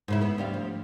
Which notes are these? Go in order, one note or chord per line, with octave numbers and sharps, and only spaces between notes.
G#2 C#3 E4
B3 E4
D2 G3 F5
F3